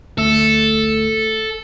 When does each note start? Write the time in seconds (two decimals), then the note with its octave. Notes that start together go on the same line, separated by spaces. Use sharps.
0.18 D2 A3 A4 E6